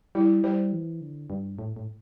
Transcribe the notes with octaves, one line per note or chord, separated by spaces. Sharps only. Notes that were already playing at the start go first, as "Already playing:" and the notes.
G3 E4
G3 C5
E3
D3
G2
A2
A2